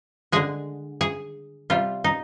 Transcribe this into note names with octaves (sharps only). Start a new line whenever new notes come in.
D3 G#3 G#4
G#4
C3 G3 F4
D#4